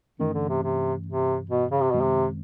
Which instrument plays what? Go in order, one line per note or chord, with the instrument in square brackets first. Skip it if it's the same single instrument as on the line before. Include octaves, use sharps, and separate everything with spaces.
[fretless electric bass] G2 E3 A3 C#4 [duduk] D#3
[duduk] D3
C3
C3
C3
B2
C#3
C3
[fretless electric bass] F#2 D#3 G#3 C4 [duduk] B2
[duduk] C3